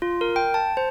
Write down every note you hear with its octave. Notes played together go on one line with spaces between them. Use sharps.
F4
A#4
G5
A5
C5